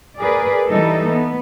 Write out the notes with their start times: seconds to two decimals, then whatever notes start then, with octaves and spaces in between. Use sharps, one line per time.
0.20 G#4 A#4 B4 D5
0.69 E3 G3 D#4 A4
1.09 B3